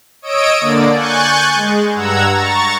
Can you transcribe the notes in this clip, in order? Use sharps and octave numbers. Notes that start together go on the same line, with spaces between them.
C#5 D#5 D#6 E6 D7
D3 A#3 D5
G#5 C#6 F#6 G6 A6
G#3
G2 F#5 A#5 E6 G#6
A#5 C#6 A6